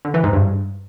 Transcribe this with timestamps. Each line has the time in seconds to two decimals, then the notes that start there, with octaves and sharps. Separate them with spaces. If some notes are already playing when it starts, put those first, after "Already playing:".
0.05 D3
0.14 E3
0.24 G#2
0.33 G2